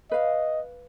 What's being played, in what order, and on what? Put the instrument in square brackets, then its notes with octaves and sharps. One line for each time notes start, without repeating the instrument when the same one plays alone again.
[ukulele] B4 F5 [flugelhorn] D#5